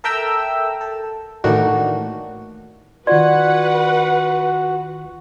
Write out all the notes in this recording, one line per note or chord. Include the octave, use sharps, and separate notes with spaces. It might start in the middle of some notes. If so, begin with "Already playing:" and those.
A4 A#4 E5 G5 A#5 E6
A4
A2 D#3 E3 A#3 D4 F#4
D#3 F4 F#4 B4 D5 F#5 C6